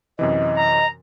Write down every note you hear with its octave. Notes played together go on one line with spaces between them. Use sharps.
F#2 C3 E3 D#5
A#5